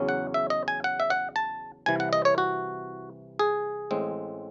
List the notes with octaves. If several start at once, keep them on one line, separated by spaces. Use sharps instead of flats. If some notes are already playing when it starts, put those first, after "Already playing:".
Already playing: E2 C#3 F#3 C#4
F#5
E5
D#5
G#5
F#5
E5
F#5
A5
C2 C3 E3 G#5
F#5
D#5
C#5
F#4
G#4
A1 A2 G#3 C4